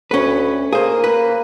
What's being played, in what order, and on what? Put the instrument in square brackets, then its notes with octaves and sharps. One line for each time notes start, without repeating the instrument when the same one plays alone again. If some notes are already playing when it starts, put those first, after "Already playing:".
[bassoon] D2 [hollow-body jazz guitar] C#4 B4
[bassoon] A#3 [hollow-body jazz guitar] G#4 C5
[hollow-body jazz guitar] B4